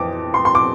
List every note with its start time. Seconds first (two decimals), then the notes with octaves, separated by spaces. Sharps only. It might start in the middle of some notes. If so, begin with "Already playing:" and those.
Already playing: F2 E3 D6
0.34 C6
0.45 C6
0.55 D6